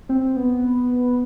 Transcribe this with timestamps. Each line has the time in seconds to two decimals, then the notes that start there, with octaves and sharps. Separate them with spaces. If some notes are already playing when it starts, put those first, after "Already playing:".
0.09 C4
0.36 B3